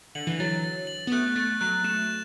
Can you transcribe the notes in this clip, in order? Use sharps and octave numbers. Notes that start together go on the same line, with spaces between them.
D3 F#7
E3
F#3 A6
A6
F#7
B3
A3 F#6
A3 A6
F#3 F#6
A3 E7